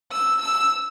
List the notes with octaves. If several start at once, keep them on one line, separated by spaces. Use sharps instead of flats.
E6
E6